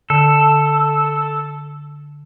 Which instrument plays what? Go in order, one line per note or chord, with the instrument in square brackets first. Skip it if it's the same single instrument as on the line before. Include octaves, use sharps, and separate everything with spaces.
[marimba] D3 [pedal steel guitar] A4